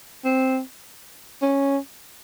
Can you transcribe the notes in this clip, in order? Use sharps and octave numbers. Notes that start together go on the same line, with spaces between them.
C4
C#4